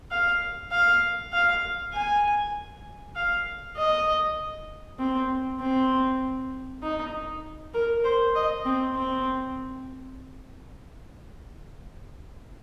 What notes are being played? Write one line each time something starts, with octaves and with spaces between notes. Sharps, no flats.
F5
F5
F5
G#5
F5
D#5
C4
C4
D#4
A#4
C5
D#5
C4
C4